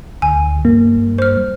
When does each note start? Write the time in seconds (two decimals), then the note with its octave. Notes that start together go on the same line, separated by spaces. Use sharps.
0.22 D2 G#5
0.65 G2 A#3
1.18 C5 F6